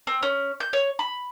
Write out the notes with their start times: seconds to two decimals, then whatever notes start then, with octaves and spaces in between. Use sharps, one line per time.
0.07 C4
0.23 C#4
0.60 G6
0.73 C#5
0.99 B5